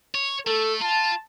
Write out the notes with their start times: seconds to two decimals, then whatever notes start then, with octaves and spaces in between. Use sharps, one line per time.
0.15 C#5
0.47 A3 A4
0.82 F4 A5